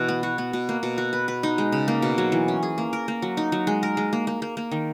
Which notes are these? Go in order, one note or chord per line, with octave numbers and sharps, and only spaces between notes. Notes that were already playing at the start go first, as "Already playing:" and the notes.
Already playing: B2 E3
B3
F#4
B3
B2
A#3
B2
F#4
B4
B4
D#4
G#3
C#3
A#3
B2
F#3
E3
C#4
G#4
A#3
A#4
A#3
F#3
D#4
F#3
G#3
A#4
G#3
A#3
A#3
A#3
A#3
D#3